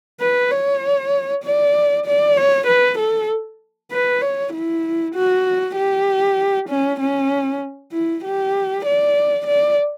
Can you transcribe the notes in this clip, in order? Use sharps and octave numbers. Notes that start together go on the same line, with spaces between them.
B4
C#5
D5
D5
C#5
B4
A4
B4
C#5
E4
F#4
G4
C#4
C#4
E4
G4
D5
D5